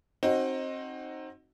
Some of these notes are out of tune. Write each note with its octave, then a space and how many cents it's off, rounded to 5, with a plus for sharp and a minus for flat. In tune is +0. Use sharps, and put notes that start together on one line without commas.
C4 +25 D#4 +0 F#4 +5